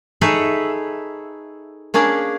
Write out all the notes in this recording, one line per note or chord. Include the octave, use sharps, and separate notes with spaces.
D#4 G#4 A4 B4 C#5 E5
A#3 C#4 D4 G#4